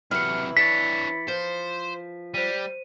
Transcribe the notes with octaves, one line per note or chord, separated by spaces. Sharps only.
C3 E3 F#3 E4 F6 C#7
D4 C#5 A6 B6 C#7
F3 C5
G3 C5 D#7